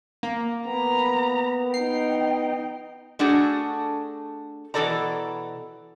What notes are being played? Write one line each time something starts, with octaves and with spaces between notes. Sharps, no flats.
A#3
B3 A#5 B5
D#4 G5 C7
A3 D4 F#4 G#4 A4
B2 E3 C4 A4 D5 A#5